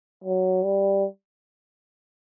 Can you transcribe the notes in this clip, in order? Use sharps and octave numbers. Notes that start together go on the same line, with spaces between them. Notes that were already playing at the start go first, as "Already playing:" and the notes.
F#3
G3